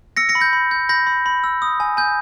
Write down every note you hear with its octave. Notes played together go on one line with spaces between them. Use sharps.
E6 A#6 C#7
A#6 C#7
B5
G6 A#6
B5
G6
B5 G6 A#6
B5
B5
E6
D#6
G#5
G#5 G6